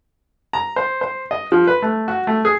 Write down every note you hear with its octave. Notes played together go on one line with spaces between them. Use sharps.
A#5
C5
C5
D#5
F3
B4
A3
F#4
A3
G#4